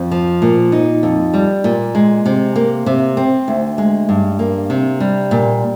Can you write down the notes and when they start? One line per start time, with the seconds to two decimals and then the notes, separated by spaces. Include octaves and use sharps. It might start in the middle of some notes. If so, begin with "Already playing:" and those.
Already playing: F2
0.11 F3
0.42 A#2
0.72 D#4
1.03 F2
1.33 G3
1.64 A#2
1.95 G#3
2.26 C3
2.56 A#3
2.86 C3
3.17 C4
3.48 D2
3.78 G#3
4.09 G2
4.39 A#3
4.70 C3
5.00 G3
5.31 A#2